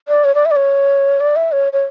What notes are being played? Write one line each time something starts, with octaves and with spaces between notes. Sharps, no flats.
D5
C#5
D5
E5
D5
C#5
D5
E5
C#5
C#5